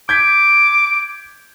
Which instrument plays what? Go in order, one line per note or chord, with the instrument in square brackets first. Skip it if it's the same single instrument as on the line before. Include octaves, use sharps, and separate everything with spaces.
[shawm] D6 [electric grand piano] G6 G#6 B6